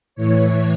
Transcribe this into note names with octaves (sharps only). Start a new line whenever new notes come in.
A2 E3 C#5